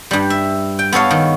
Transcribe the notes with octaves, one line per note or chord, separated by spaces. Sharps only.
G2 G3
E5
G5
B3 A4 C#5 F5
D#3